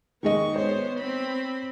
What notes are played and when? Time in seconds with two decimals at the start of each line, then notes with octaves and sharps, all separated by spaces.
0.23 D#3 G#3 B3 D#5 C#6
0.56 B3 C5 C#5
1.00 C4 B5